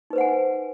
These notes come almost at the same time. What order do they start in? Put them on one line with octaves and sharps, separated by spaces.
D#4 B4 C5 F#5 G#5